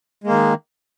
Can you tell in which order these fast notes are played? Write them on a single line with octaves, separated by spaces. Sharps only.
G#3 A#3 D#3